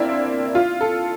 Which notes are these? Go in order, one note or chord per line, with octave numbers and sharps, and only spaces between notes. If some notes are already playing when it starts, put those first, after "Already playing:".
Already playing: A#3 C4 D4 E4
F4
A4